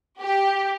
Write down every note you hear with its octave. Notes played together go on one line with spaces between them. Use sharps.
G4